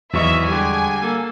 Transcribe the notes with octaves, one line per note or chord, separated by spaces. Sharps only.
G#1 E2 E3 F#3 D#5 E5 C#6
D3 G3 G#3 G4 G#5
A#3 A4